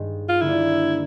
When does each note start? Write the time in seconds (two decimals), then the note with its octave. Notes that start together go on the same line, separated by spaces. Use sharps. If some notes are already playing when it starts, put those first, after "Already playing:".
Already playing: G2 D#3 G#3
0.29 F4
0.41 D3 G3 A#3 E4